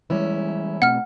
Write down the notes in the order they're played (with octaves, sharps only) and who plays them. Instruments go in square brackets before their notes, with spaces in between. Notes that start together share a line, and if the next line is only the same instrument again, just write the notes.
[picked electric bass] E3 G3 G#3 [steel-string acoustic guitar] C#4 E4
[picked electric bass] B2 A3 C4 [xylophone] F#5 F6